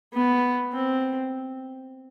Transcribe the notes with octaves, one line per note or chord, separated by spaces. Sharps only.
B3
C4